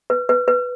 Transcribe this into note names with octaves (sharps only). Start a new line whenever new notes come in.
B4
B4
B4